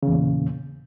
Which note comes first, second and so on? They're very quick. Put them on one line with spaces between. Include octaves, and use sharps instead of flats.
C#3 E2 A#2